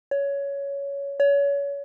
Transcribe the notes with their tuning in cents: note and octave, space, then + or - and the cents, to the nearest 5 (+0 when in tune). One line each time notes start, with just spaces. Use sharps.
C#5 +15
C#5 +30